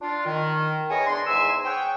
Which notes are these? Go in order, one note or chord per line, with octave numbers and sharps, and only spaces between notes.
D4 F4
D#3
B3 E4 G#4 C#5 D#5 G#5
D4 C6
E2 G#2 E5 G#5 C6 E6
G#4 C#5 F#5 G5